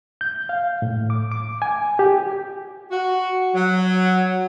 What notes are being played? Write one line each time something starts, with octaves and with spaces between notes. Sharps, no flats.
G6
F5
A2
D6
D6
G#5
G4
F#4
F#3